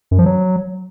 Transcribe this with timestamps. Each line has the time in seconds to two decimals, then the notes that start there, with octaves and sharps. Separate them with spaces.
0.11 F#2
0.19 F3
0.26 F#3